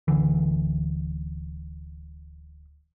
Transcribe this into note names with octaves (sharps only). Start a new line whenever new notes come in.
D1 D#2 D3 E3